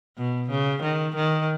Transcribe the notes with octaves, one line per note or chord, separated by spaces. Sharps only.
B2
C#3
D#3
D#3